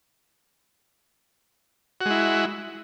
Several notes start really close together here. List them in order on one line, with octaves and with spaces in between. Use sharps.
F#4 G#3 E4